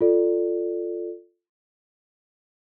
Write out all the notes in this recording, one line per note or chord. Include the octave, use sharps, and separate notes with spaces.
F4 A4 D5